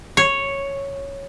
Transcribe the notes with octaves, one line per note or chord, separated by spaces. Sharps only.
C#5